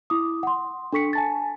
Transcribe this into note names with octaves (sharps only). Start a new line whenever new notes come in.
E4 D6 D#6
F#5 C6
D4 A4 C#6 B6 C#7
G#5 A5 A6